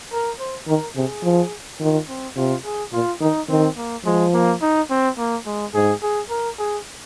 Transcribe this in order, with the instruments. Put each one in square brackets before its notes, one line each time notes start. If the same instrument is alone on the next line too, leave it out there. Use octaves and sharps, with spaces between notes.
[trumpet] A#4
C5
[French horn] D#3 [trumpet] A#4
[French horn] C3 [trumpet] G#4
[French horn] F3
[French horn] D#3 [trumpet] F4
[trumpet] C4
[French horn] C3 [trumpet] F4
[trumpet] G#4
[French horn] A#2 [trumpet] F4
[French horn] D#3 [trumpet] D#4
[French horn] D#3 [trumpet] C4
[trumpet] A#3
[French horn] F3 [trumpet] G#3
[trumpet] A#3
D#4
C4
A#3
G#3
[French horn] G#2 [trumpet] G#4
[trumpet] G#4
A#4
G#4